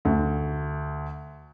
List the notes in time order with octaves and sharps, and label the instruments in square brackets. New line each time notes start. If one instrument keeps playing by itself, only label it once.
[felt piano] D2